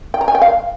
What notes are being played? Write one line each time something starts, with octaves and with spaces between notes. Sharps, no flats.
G5
A#5
G#5
G5
F5